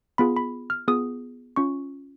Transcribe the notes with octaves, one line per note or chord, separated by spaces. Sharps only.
B3 F4 G#4 B5
B5
F6
B3 F4 G#4 D#6
C#4 F4 C#6